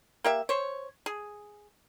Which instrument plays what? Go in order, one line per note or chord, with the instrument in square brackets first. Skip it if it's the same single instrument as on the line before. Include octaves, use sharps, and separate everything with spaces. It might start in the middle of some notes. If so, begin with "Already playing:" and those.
[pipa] A#3 G4 E5
C5 C#5
G#4